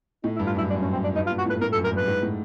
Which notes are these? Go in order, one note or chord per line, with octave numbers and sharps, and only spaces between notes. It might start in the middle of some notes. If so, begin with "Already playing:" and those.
A2 D#4
E4
G2
F4
F#2 E4
F#2 D4
C#4
C4
D4
G2 D#4
F4
A#2
F#4
A2 B4
A2 A#4
A4
F#2
A#4
G2 B4
G#2
A2